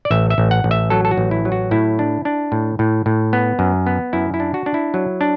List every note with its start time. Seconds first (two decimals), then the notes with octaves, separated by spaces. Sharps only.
0.05 D5
0.11 A1 E5
0.30 E5
0.38 A1
0.51 F#5
0.64 A1
0.71 E5
0.90 F#3 A4
1.05 A4
1.11 F#4
1.18 A1
1.31 E4
1.45 F#3
1.52 F#4
1.71 A2 E4
1.99 D4
2.25 D4
2.52 A2
2.79 A2
3.06 A2
3.33 B3
3.59 F#2
3.86 B3
4.13 F#2 E4
4.34 E4
4.40 D4
4.54 F#4
4.66 D4
4.74 E4
4.94 F#3
5.21 D4